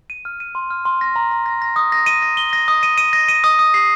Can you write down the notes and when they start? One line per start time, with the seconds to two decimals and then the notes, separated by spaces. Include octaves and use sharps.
0.10 D#7
0.25 F6
0.40 D#7
0.55 C6
0.70 F6
0.85 C6
1.01 A#6
1.16 A#5
1.31 A#5
1.46 A#6
1.62 A#6
1.76 D#6
1.92 A#6
2.06 D#7
2.22 A#6
2.37 G7
2.53 A#6
2.68 D#6
2.83 D#7
2.98 D#7
3.13 A#6
3.28 D#7
3.44 D#6
3.59 D#6
3.74 C7